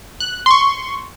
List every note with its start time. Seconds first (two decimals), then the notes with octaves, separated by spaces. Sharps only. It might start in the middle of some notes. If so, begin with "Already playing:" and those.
0.20 F#6
0.46 C6 C#6